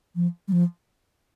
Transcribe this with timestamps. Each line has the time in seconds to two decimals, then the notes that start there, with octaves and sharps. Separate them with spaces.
0.15 F3
0.48 G3
0.52 F3